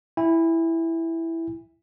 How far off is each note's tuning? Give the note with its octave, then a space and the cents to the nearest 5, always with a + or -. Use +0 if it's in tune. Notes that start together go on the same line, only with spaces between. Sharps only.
E4 +0 G#5 -40